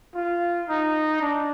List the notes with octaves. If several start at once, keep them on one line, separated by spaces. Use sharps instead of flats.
F4
D#4
D4